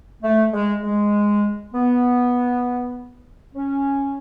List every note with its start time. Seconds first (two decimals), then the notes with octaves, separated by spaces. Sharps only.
0.23 A3
0.53 G#3
0.83 G#3
1.74 B3
3.54 C#4